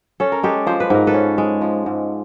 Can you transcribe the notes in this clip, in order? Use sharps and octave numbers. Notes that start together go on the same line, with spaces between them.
C#4 A4
A#4
G#3 G4 A4
F3 C5
B4
G#2 A#4
A4 B4
C#4
G#3
F3
G#2